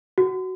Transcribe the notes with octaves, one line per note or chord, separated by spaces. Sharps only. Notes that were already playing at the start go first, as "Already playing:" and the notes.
F#4